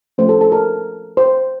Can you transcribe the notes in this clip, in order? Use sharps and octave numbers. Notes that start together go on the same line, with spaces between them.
F3 A3 C#4 C5
A4
A4
A#4
C5